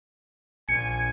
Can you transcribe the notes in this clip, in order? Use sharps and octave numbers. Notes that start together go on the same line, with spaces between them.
A#1 G#5 C#7